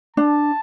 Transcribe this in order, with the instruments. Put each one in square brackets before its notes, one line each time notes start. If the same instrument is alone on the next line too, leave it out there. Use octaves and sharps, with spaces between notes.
[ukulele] D4 [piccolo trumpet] A5